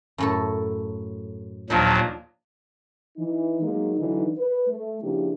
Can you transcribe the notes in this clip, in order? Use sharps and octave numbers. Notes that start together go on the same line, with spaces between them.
F#2 A2 A4
D#2 A#2 F3 F#3 D4 D#4
E3 D#4
F#3 G#3 A#3 D#4
D3 E3 F#3 D#4
B4
A3
C#3 F3 A#3 D4 E4 G4